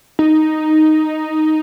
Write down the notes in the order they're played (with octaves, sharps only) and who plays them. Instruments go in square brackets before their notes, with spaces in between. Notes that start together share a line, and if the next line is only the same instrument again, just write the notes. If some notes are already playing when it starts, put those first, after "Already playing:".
[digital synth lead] D#4